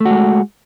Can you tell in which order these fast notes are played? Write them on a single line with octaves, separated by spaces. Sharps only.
A3 F#4 G#3